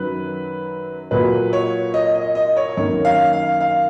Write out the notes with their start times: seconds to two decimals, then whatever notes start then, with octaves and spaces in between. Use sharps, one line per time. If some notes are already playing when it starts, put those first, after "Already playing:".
Already playing: F#2 D#3 F#3 B4
1.11 A#2 F#3 A#3 B4
1.53 C#5
1.94 D#5
2.16 D#5
2.35 D#5
2.57 C#5
2.77 F#2 D#3 A#3 C#5
3.05 F5
3.33 F5
3.60 F5